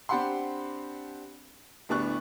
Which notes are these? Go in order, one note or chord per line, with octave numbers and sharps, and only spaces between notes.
C4 D4 G4 F#5 B5 C6
D1 A2 B3 D4 C#6 F#6